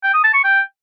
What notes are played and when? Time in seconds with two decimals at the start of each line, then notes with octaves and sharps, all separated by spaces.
0.04 G5
0.14 D#6
0.24 A5
0.34 C#6
0.44 G5